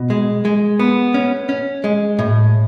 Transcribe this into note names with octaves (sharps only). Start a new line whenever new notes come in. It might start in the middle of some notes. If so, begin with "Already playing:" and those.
Already playing: B2
G#3
G#3
B3
C#4
C#4
G#3
A2